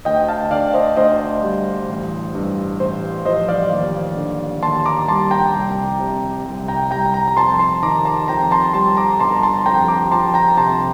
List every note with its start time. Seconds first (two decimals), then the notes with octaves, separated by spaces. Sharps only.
0.05 D2 D#5 G5
0.28 F5 A5
0.51 D3 D5 F5
0.74 C5 D#5
0.97 D2 C5 D#5
1.42 G3
1.89 A1
2.35 G2
2.80 A1 C5
3.25 F3 C5 D#5
3.48 D5 F5
3.71 D#2
4.16 D3
4.63 D#2 A5 C6
4.85 A#5 D6
5.08 G3 A5 C6
5.31 G5 A#5
5.55 C2
5.99 C3
6.45 C2
6.68 G5 A#5
6.91 G3 G5 A#5
7.14 G5 A#5
7.28 A#5
7.37 F2 A5 C6
7.59 A5 C6
7.83 D#3 A#5 D6
8.05 A5 C6
8.28 F2 G5 A#5
8.51 A5 C6
8.74 G3 A5 C6
8.97 A#5 D6
9.20 G1 A5 C6
9.31 A#5
9.43 A5 C6
9.66 F2 G5 A#5
9.88 A#5 D6
10.11 F3 A5 C6
10.34 G5 A#5
10.57 C3 A5 C6